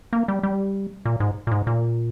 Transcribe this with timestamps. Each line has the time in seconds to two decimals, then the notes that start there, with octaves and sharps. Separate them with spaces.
0.13 A#3
0.28 G3
0.43 G3
1.05 A#2
1.20 G#2
1.47 A#2
1.51 G#2
1.67 A#2